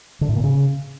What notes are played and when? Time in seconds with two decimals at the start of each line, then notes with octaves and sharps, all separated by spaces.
0.21 D3
0.29 A2
0.36 A#2
0.44 C#3